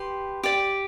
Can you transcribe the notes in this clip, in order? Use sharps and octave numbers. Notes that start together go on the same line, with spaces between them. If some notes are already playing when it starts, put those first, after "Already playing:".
Already playing: G4 B4 C6
G4 D5